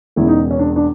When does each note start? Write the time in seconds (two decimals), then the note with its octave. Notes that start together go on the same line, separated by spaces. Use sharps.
0.16 E1 E2 C#3 E4
0.28 D#4
0.51 C#4
0.59 D4
0.76 D4